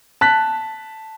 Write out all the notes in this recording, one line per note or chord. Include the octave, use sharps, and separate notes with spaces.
A5 F#6 B6